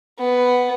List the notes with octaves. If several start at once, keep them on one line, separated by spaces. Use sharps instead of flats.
B3